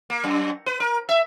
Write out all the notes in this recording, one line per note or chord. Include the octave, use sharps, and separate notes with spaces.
A#3
F#2
B4
A#4
E5